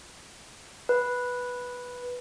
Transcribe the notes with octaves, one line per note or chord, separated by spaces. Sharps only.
B4